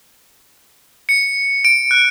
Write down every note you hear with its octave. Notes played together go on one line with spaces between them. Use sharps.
C#7
D7
F#6